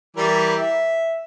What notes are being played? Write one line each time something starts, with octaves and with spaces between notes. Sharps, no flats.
E3 G3 A#4
E5